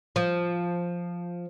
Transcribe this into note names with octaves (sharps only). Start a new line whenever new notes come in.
F3